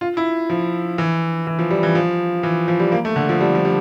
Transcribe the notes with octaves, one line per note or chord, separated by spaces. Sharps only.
F4
E4
F3
E3
E3
F3
G3
E3
F3
E3
F3
G3
A#3
A3
D3
F3
G3
F3
G3